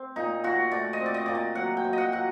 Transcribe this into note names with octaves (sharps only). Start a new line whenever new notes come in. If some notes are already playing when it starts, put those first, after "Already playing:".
Already playing: C4
A#2 D#4
A#2 F#4
A3 D5
D#5
C4
D5
D#5
A#2 D5
D#5
F#3 F#5
G5
F#3
D#5 F#5
F#3 F#5